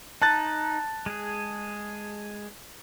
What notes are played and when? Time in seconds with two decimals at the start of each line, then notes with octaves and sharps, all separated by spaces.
0.22 D#4 A5 F#6 A6
1.06 G#3 G#4